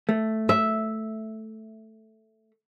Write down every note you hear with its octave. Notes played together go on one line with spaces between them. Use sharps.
A3
E5